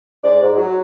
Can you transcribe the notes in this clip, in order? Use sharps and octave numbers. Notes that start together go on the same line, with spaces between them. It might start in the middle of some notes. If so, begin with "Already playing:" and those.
G#2 D5
G#2
F#3